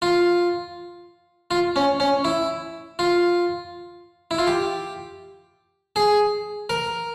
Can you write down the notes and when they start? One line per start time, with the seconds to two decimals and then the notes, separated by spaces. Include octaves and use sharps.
0.02 F4
1.51 F4
1.76 C#4
2.00 C#4
2.24 E4
2.99 F4
4.31 E4
4.38 F4
4.47 G4
5.96 G#4
6.70 A#4